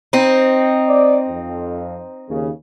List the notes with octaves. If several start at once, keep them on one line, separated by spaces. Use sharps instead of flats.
C4 D#4
D5
F2
D#2 C#3